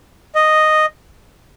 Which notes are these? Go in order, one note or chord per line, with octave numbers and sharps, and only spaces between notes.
D#5